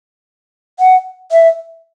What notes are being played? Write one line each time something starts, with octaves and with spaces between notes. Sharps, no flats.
F#5
E5